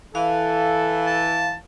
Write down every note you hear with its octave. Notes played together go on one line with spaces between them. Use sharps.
E3 A4 F5
A5